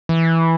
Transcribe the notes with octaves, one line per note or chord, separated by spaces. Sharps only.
E3